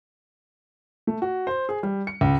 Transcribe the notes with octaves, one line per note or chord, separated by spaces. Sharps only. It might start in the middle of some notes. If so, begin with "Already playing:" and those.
A3
F#4
C5
G#4
G3
C#7
C#2